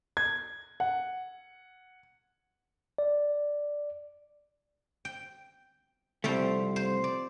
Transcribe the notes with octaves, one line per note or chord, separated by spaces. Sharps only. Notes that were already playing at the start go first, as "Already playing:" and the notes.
G#6
F#5
D5
G5
C2 F3 G3 A3 C4
C5
D5